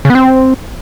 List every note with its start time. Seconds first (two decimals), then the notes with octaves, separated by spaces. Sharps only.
0.05 C#3
0.10 B3
0.15 C4